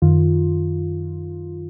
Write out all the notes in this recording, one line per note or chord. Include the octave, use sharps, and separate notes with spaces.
F#2 D#3 F4